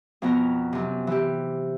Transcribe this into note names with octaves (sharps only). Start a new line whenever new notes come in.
F2 B2 B3 A#5
F#2 C3
E3 G4